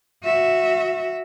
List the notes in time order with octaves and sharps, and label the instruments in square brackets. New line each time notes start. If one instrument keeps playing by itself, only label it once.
[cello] F#4 E5